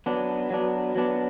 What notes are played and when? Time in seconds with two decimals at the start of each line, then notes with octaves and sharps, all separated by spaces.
0.06 F#3 B3 D4
0.50 F#3 B3 D4
0.96 F#3 B3 D4